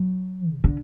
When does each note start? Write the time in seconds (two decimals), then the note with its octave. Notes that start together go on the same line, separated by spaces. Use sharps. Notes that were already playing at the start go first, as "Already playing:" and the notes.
Already playing: F#3
0.52 C3
0.64 D3